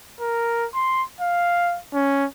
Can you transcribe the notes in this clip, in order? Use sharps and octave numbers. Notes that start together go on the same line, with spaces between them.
A#4
C6
F5
C#4